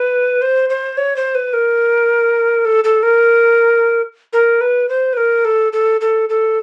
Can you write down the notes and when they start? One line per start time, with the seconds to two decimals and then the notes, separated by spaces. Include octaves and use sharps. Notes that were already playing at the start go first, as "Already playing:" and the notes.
Already playing: B4
0.42 C5
0.70 C5
0.97 C#5
1.16 C5
1.35 B4
1.53 A#4
2.65 A4
2.84 A4
3.03 A#4
4.33 A#4
4.61 B4
4.89 C5
5.13 B4
5.17 A#4
5.45 A4
5.73 A4
6.01 A4
6.29 A4